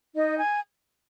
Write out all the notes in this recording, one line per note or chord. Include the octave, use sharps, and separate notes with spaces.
D#4 D#5
G#5